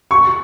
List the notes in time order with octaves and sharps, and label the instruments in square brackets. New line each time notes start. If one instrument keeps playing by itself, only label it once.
[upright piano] C#6